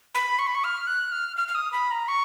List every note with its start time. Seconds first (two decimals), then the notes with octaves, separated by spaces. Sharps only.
0.15 B5
0.39 C#6
0.47 B5
0.55 C#6
0.64 F6
0.87 F#6
1.12 F6
1.36 F6
1.48 F6
1.55 D#6
1.72 B5
1.91 A#5
2.08 C#6